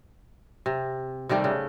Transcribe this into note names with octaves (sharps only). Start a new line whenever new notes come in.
C3
C3 D#3 G3 A3
C#3